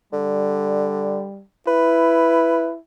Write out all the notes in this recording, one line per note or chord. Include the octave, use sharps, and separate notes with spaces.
D3 G3
E4 B4